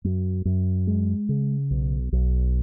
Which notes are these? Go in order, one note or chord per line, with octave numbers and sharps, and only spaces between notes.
F#2
F#2
G#3
C#3
B1
B1